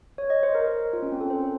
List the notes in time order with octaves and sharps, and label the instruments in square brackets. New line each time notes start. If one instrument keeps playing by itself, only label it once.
[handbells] C#5
D#5
C5
A#4
F4
C#4
C4
A4
C5